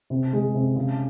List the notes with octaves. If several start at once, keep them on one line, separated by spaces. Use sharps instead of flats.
C3
G#3
C3
C#3